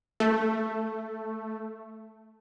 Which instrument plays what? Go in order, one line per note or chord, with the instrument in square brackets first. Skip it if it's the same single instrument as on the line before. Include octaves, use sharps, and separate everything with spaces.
[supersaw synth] A3